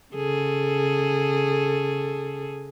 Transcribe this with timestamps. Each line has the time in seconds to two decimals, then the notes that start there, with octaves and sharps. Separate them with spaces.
0.15 C#3 G#4 A4